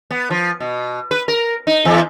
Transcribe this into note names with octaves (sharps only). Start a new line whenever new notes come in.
B3
F3
B2
B4
A#4
D#4
E2